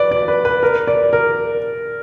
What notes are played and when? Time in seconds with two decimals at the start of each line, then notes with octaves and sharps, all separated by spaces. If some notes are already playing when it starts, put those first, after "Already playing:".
Already playing: B4 D5
0.11 D5
0.28 B4
0.45 B4
0.63 A#4
0.87 D5
1.13 A#4